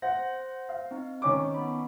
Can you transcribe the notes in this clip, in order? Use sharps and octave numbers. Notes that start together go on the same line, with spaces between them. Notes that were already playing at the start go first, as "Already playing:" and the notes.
C5 F#5 A#6
F5
C4 D#4
D#3 C#4 D6
B3 B5